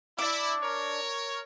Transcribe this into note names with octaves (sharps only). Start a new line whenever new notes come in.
D4 E4 D6
A#4 C#5